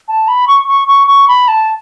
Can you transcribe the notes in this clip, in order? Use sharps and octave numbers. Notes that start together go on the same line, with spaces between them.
A5
B5
C#6
C#6
C#6
C#6
B5
A5